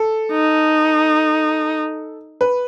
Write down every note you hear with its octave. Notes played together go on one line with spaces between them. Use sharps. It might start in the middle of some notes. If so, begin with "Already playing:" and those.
Already playing: A4
D#4
B4